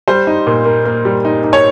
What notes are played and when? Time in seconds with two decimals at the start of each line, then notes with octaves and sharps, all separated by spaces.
0.08 G3 C5
0.27 D#4
0.47 A#2
0.65 A#3
0.85 A#3
1.05 G3
1.25 D#4
1.44 D#4
1.53 C#5